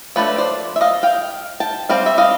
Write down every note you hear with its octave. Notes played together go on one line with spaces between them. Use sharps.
F3 A3 D4 B4 C#5
C5 D5
E5
D#5 F5
F5 G5
G5 A5
G3 C4 F5 G5
E5
D#5 F5